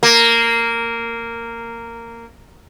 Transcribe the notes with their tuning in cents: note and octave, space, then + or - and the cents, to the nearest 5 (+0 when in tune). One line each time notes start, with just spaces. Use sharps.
A#3 -10